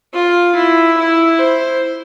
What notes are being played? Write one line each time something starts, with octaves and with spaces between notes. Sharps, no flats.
F4
E4
E4
C5